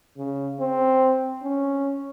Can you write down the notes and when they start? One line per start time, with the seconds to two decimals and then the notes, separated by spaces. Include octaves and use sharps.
0.17 C#3
0.60 C4
1.43 C#4